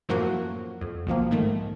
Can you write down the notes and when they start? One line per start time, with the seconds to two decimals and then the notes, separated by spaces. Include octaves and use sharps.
0.09 F#2 A2 F3 F#3 A#3 F#4
0.81 F2
1.07 B1 D#3 F3 A#3
1.31 G#2 D#3 A3